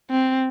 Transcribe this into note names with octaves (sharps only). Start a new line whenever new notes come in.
C4